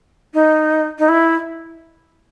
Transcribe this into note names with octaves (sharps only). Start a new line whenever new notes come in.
D#4
D#4
E4